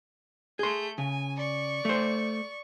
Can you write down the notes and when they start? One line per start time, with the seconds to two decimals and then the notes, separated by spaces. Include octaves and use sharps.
0.59 A3 G#4 C6 G6
0.98 C#3 G#5
1.36 D5 C#6
1.85 A3 C5